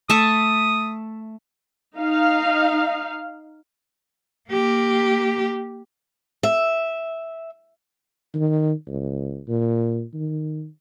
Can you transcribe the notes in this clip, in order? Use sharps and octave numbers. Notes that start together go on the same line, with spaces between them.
A3 E5 A5 D#6
D#4 F5
A#3 G4
E5
D#3
C#2
A#2
D#3